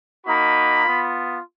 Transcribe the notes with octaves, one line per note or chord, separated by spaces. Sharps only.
A#3 D#4 F#4 B5
B3 F4